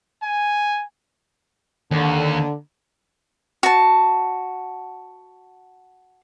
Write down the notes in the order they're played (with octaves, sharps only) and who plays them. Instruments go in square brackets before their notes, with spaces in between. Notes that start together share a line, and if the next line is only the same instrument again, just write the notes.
[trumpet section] G#5
[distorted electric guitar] D#2 [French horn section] D3
[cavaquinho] F#4 A5